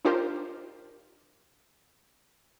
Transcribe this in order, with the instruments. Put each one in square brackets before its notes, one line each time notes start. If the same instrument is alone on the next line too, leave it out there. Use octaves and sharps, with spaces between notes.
[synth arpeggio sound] D4 D#4 F4 G4 A#4 C5